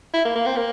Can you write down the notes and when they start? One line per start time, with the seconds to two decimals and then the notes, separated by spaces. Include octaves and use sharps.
0.14 E4
0.25 A#3
0.35 A#3
0.46 C4
0.56 A#3